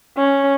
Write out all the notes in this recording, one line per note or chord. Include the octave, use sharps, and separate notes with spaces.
C#4